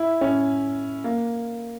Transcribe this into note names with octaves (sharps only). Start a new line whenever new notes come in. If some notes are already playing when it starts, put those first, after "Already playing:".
Already playing: E4
C#4
A#3